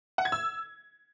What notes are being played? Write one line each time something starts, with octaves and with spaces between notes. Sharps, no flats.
F#5
G#6
E6